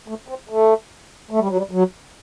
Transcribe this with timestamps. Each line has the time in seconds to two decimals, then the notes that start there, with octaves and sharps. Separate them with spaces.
0.08 A3
0.28 C4
0.49 A3
1.31 A3
1.39 G3
1.48 F#3
1.58 G3
1.71 F#3